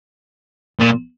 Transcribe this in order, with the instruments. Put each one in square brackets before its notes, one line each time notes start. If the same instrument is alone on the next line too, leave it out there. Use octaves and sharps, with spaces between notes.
[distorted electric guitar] A#2